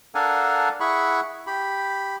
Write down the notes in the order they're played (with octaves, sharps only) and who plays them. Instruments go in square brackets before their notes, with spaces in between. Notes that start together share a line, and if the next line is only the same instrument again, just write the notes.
[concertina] D4 A4 A#4 F5 F#5 G#5
E4 G#4 F#5 B5 C#6
G4 B5